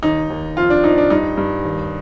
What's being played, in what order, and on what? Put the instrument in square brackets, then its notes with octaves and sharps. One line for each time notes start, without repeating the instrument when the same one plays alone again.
[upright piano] D#2 D#4
D#2
F2 F4
D4
F2 D#4
D4
G2 D#4
G2
D#2